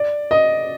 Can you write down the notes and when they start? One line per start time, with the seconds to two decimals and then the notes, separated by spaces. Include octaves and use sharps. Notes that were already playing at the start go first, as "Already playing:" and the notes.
Already playing: D5
0.31 D#5